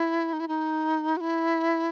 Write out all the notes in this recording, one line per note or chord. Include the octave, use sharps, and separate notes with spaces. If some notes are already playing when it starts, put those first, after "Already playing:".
Already playing: E4
D#4
E4
D#4
F#4
E4